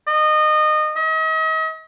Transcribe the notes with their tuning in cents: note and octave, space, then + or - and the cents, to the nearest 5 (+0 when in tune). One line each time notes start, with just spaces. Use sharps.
D#5 -25
D#5 +40